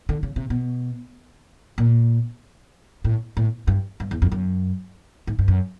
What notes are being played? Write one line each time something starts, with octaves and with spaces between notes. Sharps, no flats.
D3
C#3
C3
B2
A#2
A2
A2
G2
G2
E2
F2
F#2
G#2
G2
F#2